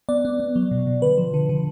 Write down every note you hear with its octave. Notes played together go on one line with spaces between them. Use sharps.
B3 D5
B3
B3
F#3
B2
B2
D3 B4
F3
D3
D3